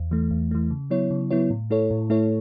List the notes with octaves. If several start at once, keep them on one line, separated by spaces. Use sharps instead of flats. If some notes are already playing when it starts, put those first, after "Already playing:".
Already playing: E2
E3 A3
E2
E3 A3
C#3
F#3 B3 E4 C#5
C#3
F#3 B3 E4 C#5
A2
A3 E4 A4 C#5
A2
A3 E4 A4 C#5